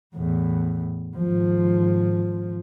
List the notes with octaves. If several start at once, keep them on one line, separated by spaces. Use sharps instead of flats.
E2 A2
G#1 F3